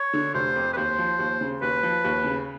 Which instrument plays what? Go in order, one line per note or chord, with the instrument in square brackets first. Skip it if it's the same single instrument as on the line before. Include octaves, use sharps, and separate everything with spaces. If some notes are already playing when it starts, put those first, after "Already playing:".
Already playing: [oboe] C#5
[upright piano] D3
[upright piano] F1 [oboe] C5
[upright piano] F2
[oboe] B4
[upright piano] D#2 [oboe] C5
[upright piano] F3
D#2
C#3
[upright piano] D#2 [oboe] B4
[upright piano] F3
D#2
C#3